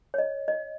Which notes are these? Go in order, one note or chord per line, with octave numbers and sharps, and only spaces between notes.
C#5
D#5
D#5